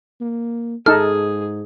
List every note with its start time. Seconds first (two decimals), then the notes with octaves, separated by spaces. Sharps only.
0.21 A#3
0.86 G#2 D#4 G#4 A4 F6